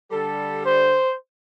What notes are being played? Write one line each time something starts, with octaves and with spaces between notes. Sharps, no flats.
D3 G3 A4
C5